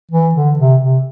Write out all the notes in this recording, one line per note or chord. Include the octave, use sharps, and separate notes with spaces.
E3
D3
C3
C3